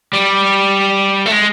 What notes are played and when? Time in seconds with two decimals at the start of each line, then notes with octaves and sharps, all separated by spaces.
0.13 G3
1.26 A3
1.32 G#3